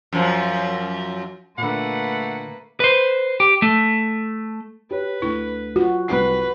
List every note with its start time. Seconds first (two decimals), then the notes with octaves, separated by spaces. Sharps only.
0.13 F#2 F3
1.58 A#2 D3 A3 A#3 B4 F#5 B5
2.80 B4 C5
3.40 G4
3.62 A3
4.91 G4 B4 C#5
5.22 D2 E4
5.76 F4 F#4
6.08 C2 C4 B4 C7